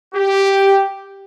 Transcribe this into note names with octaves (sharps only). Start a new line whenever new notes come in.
G4